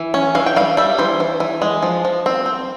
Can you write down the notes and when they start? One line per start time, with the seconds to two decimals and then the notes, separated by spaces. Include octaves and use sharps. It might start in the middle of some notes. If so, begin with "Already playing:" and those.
Already playing: E3
0.14 C#4
0.35 E3 F5
0.46 G5
0.56 G3 F5
0.77 G3 E5
0.98 E3 C5
1.20 E3
1.40 E3
1.62 G#3
1.83 F3
2.05 F3
2.26 C4
2.46 C4